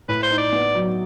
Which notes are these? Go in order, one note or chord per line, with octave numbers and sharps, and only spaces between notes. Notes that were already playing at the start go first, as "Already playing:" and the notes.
A2 B4
C5
D#4
D5
B3
F#3